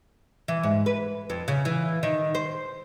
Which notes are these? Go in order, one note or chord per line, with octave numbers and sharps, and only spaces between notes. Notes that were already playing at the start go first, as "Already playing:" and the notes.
E3
G#2
B4
F2
C#3
E3
D#3
C5